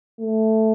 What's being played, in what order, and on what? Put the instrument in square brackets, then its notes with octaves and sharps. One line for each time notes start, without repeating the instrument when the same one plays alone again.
[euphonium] A3